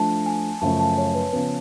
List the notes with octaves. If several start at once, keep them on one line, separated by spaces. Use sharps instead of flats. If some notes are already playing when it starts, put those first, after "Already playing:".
Already playing: F3 A3 D4 A5
G#5
F#2 C#3 F3 A3 C#4 A5
A5
C#5
B4
C#3 F3 B3